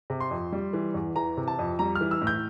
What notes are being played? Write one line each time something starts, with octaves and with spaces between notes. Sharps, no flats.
C3
C6
F2
G3
E3
E2
E3 A#5
C3
A5
F2
G3 A#5
F6
E3
E6
A2
G6